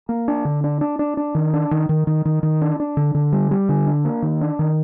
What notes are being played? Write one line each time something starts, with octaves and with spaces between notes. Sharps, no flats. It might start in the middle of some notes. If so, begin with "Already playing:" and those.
A#3
D4
D3
D4
D4
D4
D4
D#3
D4
D#3
D#3
D#3
D#3
D#3
D4
D4
D3
D3
G3
G3
D3
D4
A#3
D#3
D4
D#3